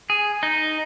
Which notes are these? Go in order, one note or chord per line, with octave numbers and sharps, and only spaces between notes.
G#4
D#4